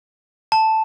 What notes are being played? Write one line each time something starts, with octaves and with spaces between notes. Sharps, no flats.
A5